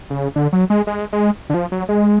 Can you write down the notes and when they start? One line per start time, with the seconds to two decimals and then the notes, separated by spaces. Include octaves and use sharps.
0.10 C#3
0.36 D3
0.53 F#3
0.70 G#3
0.87 G#3
1.13 G#3
1.50 D3
1.54 F3
1.72 F#3
1.89 G#3